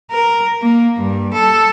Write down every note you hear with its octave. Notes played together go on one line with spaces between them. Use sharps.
A#4
A#3
G2
A4